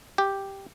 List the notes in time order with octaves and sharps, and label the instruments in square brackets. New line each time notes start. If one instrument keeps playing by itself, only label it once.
[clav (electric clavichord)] G4